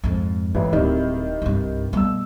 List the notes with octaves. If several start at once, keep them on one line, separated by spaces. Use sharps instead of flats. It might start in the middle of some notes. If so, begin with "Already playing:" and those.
F2 G#2
A1 G#2 E3
D1 D#3 G3 E4
C2 G2
B2 G3 A3 E6